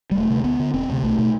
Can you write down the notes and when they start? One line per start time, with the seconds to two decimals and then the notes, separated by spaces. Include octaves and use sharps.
0.11 G3
0.15 E1 A3
0.30 D2 C3
0.44 D2 B3
0.60 D3
0.74 E1 C4
0.88 D2 C3
1.03 B1 A3
1.18 B2 A3